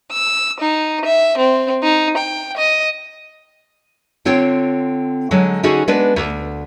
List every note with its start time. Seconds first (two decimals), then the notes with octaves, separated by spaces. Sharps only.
0.12 E6
0.61 D#4
1.05 E5
1.38 C4
1.83 D#4
2.17 G5
2.57 D#5
4.25 D3 C4 F4 C#5 G5
5.31 D3 F#3 G#3
5.63 D3 C#4 D#4 F#4 G#4
5.88 G#3 B3 D4 B4 D5
6.16 D2